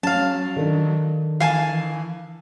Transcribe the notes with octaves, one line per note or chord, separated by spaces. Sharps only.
F#3 C#4 F5 A5
D3 D#3 D4
E3 F5 G#5 A5